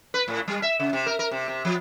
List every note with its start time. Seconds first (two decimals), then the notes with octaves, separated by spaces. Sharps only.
0.14 B4
0.28 A2
0.48 G3
0.62 E5
0.80 C#3
0.93 C3
1.06 A#4
1.19 A#4
1.31 C3
1.48 C3
1.65 F3